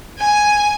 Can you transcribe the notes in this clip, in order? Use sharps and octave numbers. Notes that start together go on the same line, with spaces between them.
G#5